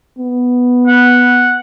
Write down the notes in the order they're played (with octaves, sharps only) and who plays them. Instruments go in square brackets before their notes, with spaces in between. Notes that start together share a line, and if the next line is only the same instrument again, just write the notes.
[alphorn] B3
[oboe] F#5